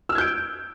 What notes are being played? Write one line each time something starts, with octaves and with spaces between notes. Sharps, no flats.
E6 F6 G6 G#6 D7